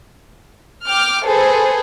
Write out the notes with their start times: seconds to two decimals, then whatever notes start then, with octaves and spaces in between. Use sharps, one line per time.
0.87 G5 D6 F6
1.25 G#4 A4 B4 C5